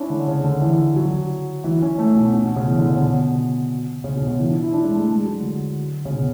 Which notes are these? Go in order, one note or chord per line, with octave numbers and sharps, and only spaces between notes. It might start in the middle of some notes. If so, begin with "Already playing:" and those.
Already playing: C#4 D4 E4
D3
C#3
D3
E3
F#3
E3
C#4
A3
B2
B2
B2
C#3
E3
D3
C#3
B2
C#3
B2
C#3
E3
D4
E4
D4
G#3
A3
G#3
F#3
D3
C#3
B2